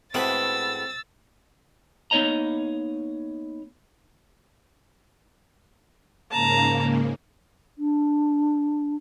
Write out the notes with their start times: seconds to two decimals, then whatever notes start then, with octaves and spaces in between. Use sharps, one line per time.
0.14 A2 G#3 B3 C4 F#4 B4 E6 A6
2.11 A#3 B3 D#4 C#5 D#5 A#5
6.31 G#2 C#3 A#3 A5 A#5
7.76 D4